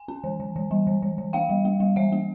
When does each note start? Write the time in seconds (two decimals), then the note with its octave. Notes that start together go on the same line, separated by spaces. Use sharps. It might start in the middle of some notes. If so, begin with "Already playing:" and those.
Already playing: G#5
0.08 C#4
0.24 E3
0.40 E3
0.56 E3
0.71 G3
0.87 E3
1.02 E3
1.18 E3
1.33 A#3 F5 G5
1.49 G3
1.65 A#3
1.80 G3
1.96 E3 E5 F#5
2.12 A#3